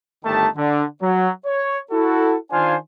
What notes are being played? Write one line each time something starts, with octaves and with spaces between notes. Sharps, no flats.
G1 D#3 A3 D#4 G4 A5
D3
F#3
C#5
E4 F#4 A4
D#3 D4 F4 C5 F5 G#5